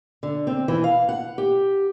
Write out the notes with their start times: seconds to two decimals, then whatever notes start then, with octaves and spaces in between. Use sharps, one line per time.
0.23 D3
0.47 C4
0.68 E3
0.84 F5
1.09 F#5
1.38 G4